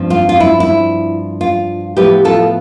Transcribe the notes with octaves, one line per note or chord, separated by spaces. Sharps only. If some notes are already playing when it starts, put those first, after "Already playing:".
Already playing: G2 F3 C4
F4
F4
E4
E4
F4
A2 F3 B3 E4 G4 B4
F4 A4